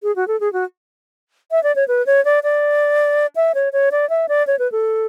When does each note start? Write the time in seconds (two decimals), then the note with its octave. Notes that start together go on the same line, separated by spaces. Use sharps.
0.03 G#4
0.16 F#4
0.28 A4
0.40 G#4
0.53 F#4
1.51 E5
1.64 D5
1.76 C#5
1.88 B4
2.06 C#5
2.25 D5
2.44 D5
3.36 E5
3.55 C#5
3.73 C#5
3.92 D5
4.10 E5
4.29 D5
4.47 C#5
4.59 B4
4.72 A4